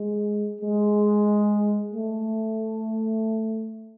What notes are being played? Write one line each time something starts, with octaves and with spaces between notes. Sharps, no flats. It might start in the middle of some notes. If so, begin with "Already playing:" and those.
Already playing: G#3
G#3
A3